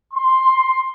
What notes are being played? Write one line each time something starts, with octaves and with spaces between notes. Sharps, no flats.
C6